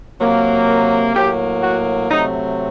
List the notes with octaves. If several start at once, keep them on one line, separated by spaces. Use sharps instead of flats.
C3 F#3 A#3
A#4
A2 F#3 A#3 G4
F#4
C3 F#3 A3 C4 D#4